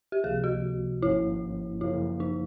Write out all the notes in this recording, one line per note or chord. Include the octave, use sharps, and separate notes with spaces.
G4
C#2 C3 F3 A#3 G#4
F#4
G#1 G#2 F3 A#3 C#4 E4
F#2 C#3 F3 A#3 E4
D#4